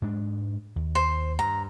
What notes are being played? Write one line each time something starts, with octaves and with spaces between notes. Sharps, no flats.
G#2 G#3 D4
D#2
C5
G2 A#5